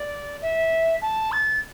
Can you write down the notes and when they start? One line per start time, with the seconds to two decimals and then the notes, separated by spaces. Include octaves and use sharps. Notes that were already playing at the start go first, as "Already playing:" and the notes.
Already playing: D5
0.42 E5
1.02 A5
1.32 A6